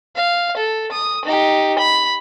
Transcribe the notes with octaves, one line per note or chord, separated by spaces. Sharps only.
F5
A4
D#6
D#4 G4
B5